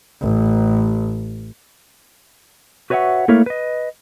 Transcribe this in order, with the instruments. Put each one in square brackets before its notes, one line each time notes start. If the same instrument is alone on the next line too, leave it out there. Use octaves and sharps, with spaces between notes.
[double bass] A1
[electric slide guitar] F#4 B4 C#5 D#5 E5 F#5
A3 A#3 E4 A#4 C#5
B4 D#5